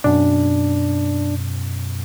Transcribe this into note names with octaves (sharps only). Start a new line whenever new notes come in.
F#2 B2 D4